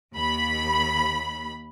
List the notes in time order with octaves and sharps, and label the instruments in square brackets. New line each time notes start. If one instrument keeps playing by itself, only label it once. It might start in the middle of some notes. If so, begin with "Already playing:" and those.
[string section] D#2 B5